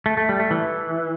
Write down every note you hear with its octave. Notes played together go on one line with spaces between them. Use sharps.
A3
A3
G3
A3
E3